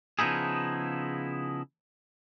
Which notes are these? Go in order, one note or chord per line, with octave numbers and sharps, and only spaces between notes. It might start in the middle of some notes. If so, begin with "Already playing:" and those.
C#3 F3 B3 D#4 E4 G#4